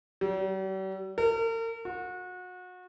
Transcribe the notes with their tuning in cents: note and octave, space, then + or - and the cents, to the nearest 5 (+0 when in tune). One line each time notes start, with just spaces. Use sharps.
G3 -45
A#4 -40
F#4 -30